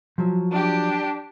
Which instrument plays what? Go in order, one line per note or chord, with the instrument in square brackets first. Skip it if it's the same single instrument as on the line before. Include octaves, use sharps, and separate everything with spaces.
[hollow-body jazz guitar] F3 F#3
[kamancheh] D4 G4